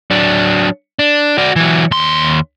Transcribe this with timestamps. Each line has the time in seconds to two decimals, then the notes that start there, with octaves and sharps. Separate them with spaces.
0.11 F#3 D4
0.99 D4
1.38 F#4 D5
1.56 E3 F#3
1.91 D#2 C6